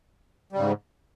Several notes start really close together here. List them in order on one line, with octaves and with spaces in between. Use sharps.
G3 C#3 G#2